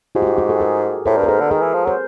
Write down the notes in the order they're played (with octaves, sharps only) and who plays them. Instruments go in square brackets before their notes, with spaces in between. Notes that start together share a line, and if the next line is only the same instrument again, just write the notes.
[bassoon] G#2 [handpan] F4 G4
[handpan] F#4
F4 G4
F#4 G#4
G4 A4
G#4 A#4
[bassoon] A2 [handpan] A#4 C5
[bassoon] G2
[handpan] A#4
[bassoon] G#2 [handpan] A4 B4
[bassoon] D3
[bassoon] D#3 [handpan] G#4 A#4
[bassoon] E3
F3
[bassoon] F#3 [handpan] C5